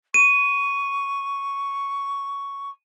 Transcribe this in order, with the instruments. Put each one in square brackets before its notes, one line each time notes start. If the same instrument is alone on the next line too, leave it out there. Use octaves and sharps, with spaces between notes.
[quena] C#6 [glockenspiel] D#7